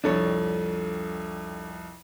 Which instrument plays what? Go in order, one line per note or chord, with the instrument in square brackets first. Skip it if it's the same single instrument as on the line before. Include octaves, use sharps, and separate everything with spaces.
[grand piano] C2 F2 [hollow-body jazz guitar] D4 A4 C#5